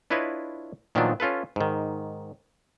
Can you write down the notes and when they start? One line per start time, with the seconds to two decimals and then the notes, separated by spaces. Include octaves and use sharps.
0.10 D4 E4 F4 B4 C#5 D#5
0.95 A#2 D#3 F3 F#3 B3 D4
1.20 C#4 F4 A4 B4
1.56 G#2 D#3